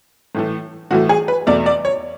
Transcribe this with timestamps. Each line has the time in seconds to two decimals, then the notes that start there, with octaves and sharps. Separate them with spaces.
0.35 A2 E3 A3
0.91 A2 E3 A3 F#4
1.09 G#4
1.28 B4
1.47 E2 B2 A3 D5
1.66 D5
1.85 C#5